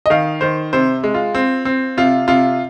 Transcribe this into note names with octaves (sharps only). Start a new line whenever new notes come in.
D#5
D#3 F5
D#3 C5
C3 C5
G#3
F4
C4
C4
C3 F4
C3 F4